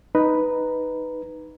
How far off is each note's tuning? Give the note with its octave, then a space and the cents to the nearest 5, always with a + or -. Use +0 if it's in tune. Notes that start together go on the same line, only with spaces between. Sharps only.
D#4 +0 B4 +0 A#5 +0